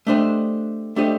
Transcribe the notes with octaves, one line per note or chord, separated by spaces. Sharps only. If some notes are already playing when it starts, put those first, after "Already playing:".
A3 D4 G4 C5 D#5
A3 D4 G4 C5 D#5